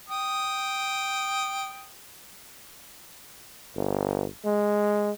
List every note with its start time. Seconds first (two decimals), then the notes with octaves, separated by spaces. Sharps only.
0.09 G5 D#6
3.76 G1
4.45 G#3